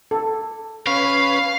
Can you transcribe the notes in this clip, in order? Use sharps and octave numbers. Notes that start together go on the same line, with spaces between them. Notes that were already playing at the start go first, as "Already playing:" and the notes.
A4
C#4 B4 F5